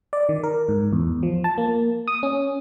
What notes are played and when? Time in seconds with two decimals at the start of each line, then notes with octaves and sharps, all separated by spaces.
0.13 D5
0.29 D#3
0.43 A#4
0.69 G#2
0.92 E2
1.23 F3
1.44 A5
1.58 A#3
2.08 D#6
2.23 C#4